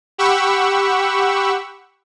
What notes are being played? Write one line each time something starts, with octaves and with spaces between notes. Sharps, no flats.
G4 F#5 B5 C#6 E6